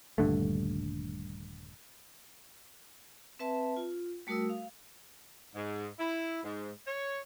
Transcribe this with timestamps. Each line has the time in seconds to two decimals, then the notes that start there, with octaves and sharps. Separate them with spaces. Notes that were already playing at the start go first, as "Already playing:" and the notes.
0.18 D#1 G2 D3 A3
3.39 C4 B4 E5 A5
3.76 F4
4.27 G3 A3 F#4 A#4 D#6 E6
4.49 F5
5.55 G#2
5.99 E4
6.44 G#2
6.87 C#5